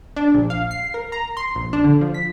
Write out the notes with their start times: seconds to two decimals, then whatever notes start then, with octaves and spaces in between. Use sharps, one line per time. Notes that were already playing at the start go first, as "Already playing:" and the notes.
0.16 D4
0.34 A#1
0.50 F5
0.71 C7
0.94 A#4
1.12 A#5
1.37 C6
1.55 A#1
1.73 D4
1.84 D3
2.01 F3
2.14 B6